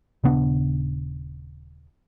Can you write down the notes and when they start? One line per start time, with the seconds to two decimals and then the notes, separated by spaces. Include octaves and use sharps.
0.24 D#1 C#3 B3 D4